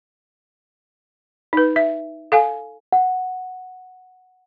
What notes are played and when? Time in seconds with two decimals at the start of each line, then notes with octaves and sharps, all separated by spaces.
1.53 D#4 B4
1.76 E5
2.32 A4 F5 G#5
2.93 F#5